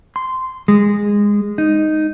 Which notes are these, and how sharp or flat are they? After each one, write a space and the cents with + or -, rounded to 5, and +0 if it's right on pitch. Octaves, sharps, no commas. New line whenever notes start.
C6 -10
G#3 -15
D#4 -5